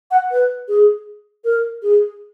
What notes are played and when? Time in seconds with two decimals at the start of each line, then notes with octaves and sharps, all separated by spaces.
0.11 F#5
0.31 B4
0.68 G#4
1.45 A#4
1.83 G#4